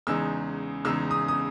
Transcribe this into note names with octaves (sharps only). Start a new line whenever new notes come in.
E2 C#3 G#3 D#4 E6
E2 C#3 G#3 D#4 E6
D#6
D#6